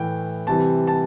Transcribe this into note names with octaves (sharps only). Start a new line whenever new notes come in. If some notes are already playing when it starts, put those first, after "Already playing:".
Already playing: A2 E3 A3 G5
C3 E3 G3 A5
A5